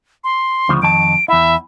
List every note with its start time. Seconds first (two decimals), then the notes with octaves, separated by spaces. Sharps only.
0.24 C6
0.69 D2 C#3 F3
0.82 F2 D#3 A5 D7
1.28 E2 E4 E5